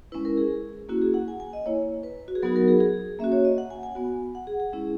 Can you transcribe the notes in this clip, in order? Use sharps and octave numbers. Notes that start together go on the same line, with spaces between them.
G#3 C#4 E4 B4
A#4
G#4
A#3 C#4 E4 F#4
G#4
F#5
G#5
G#5
D#5
A#3 E4 C#5
B4
F#4
G#4
F#3 B3 D#4 F#4 A#4
A#4
G#4
G#4
A#3 C#4 F#4 E5
C#5
D#5
F#5
G#5
G#5
B3 F#4
F#5
G#4
G#4
G#3 C#4 E4 G#4